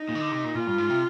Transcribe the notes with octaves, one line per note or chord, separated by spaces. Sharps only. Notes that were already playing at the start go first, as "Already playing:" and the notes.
Already playing: D#4
A#2
D#3
D3
C3
A#2
A#2 F4
G2
G#2
C3